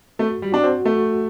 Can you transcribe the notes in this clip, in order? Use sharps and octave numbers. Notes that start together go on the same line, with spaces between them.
A3 F#4
G3
D4 F#4
C4
A3 F#4